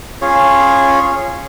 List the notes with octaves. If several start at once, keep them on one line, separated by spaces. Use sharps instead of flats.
C#4 F4 G#4 C#5